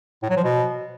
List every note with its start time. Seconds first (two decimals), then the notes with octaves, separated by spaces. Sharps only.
0.23 A2
0.30 F#3
0.37 F3
0.44 B2